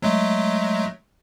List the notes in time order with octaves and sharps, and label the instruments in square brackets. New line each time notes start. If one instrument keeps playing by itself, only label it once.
[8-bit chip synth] F#3 G#3 A3